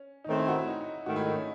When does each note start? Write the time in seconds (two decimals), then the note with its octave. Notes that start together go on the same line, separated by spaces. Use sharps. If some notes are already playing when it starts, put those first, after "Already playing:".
Already playing: C#4
0.24 D#4
0.28 D#3 A3 C4 C#4
0.39 E4
0.48 F#4
0.58 E4
0.68 D#4
0.81 D#4
1.06 G#2 D#3 A3 F#4
1.16 E4
1.26 D#4
1.36 C#4